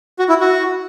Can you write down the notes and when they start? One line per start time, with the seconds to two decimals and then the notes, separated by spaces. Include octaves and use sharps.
0.19 F#4
0.29 E4
0.41 F#4